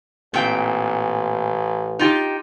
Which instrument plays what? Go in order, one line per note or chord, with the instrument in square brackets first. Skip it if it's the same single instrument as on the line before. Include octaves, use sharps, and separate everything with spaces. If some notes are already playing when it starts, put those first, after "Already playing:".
[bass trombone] A1 [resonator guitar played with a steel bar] A#2 C4 G5
[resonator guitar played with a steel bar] D#4 F4 G4